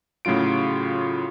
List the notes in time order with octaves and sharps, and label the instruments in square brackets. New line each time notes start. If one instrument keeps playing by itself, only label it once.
[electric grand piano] A2 C#3 F#3 F4 D7